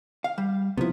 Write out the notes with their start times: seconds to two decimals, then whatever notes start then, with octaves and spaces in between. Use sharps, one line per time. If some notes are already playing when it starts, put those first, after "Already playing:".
0.24 F5
0.38 G3
0.77 C3 D#3 F3 B3 E4